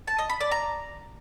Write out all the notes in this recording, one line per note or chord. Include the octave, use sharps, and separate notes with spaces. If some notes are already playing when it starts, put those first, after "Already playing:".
A5
D#5
B5
D5
A#5